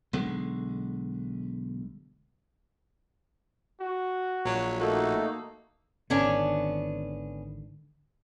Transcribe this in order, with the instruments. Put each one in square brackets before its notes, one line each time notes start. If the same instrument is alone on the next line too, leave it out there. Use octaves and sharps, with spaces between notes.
[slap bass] B1 D3 G#3
[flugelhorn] F#4
[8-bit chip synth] A#1 [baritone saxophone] F#3
[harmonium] A3 D#4 A4 [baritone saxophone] A#3 [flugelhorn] F#4
[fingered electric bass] G#1 D3 D#3 [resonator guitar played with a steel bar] B3 C#4 D4